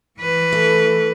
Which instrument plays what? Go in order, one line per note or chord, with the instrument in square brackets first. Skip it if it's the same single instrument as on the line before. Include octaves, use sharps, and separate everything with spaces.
[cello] E3 B4
[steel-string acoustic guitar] A3